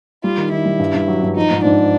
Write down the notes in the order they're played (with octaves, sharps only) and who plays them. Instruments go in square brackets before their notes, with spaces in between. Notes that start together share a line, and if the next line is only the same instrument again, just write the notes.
[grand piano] G3 [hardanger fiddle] F4
[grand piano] D#3
[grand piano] D#3 [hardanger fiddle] E4
[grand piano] G3
G2
G2
F#3
G2
[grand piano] F3 [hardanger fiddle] D#4
[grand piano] G#2
[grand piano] G#2 [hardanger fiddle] D4